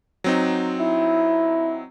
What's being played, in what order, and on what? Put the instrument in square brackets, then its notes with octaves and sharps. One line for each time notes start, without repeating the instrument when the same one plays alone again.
[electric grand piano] F#3 C4 D#4
[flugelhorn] E4